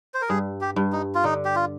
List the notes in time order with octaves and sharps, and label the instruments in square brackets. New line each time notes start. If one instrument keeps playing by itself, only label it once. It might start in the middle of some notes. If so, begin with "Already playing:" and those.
[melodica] C5
A#4
[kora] G2 [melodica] G#4
[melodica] G4
[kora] G2
[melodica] D#4
F4
[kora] D3 [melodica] D#4
[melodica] G4
F4